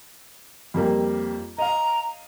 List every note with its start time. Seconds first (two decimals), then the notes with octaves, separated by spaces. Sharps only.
0.74 F2 G3 A#3
1.58 D#5 F5 A#5